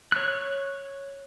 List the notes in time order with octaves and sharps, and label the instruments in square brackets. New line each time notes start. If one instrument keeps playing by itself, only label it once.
[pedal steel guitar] C#5 F#6